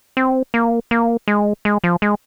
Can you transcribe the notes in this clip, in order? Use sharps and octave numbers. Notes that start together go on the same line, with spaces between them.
C4
A#3
A#3
G#3
G#3
F3
G#3